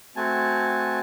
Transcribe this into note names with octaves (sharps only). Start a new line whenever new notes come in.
A3 C4 F#4 G#5 A5